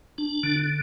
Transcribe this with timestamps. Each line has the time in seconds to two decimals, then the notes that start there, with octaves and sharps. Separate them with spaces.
0.18 D4
0.43 D3